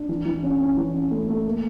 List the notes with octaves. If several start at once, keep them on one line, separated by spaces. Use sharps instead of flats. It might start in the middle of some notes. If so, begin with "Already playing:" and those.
Already playing: D4
E3
E3
C#4
C#4
E3
C#4
A3
A3
A#3